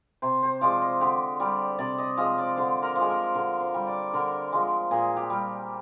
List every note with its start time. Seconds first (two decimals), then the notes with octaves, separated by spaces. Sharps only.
0.22 C3 C5
0.43 C5
0.61 F3 G#3 D5
0.81 D#5
1.01 D3 G4
1.40 G3 D5
1.79 C3 D5
1.98 D#5
2.17 F3 G#3 D#5
2.38 D5
2.57 D3 C5
2.82 A#4
2.95 F3
3.01 G#3
3.09 A#4
3.35 D3 A#4
3.61 C5
3.74 G3
3.87 D5
4.14 D3 A#4
4.52 F3 G#3
4.91 A#2 G#4
5.17 G4
5.30 G3